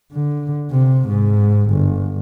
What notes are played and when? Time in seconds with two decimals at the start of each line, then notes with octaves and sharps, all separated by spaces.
0.12 D3
0.71 C3
1.08 G#2
1.70 G1